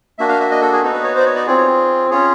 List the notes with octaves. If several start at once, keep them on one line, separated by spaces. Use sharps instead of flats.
A#3 D4 F#4 E5
F5
E5
D#5
A4
G#4
B3 D#4 F#4 A4
B4
C#5
C5 D5
C#5
D5
C4 F4 G#4 D5
C#5
C#4 F4 G#4 C#5